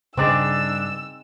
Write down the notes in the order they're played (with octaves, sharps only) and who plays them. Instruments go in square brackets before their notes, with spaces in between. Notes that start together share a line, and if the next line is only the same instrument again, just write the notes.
[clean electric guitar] G2 D4 D5 [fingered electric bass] C#3 [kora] C4 D#4 G#4 [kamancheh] E6